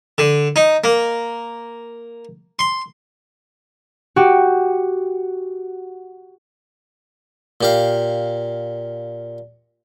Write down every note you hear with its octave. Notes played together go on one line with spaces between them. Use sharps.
D3
D#4
A#3
C6
F#4 G4
A#2 G4 F5